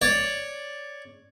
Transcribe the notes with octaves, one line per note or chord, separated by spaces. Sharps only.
C#5 D5